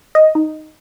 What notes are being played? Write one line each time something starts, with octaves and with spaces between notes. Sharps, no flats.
D#5
D#4